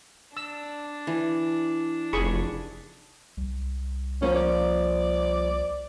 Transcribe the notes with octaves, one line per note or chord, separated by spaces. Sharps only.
D4 E6
E3
F1 G#4 B5 C#6
C2
F3 A#3 C#4
D5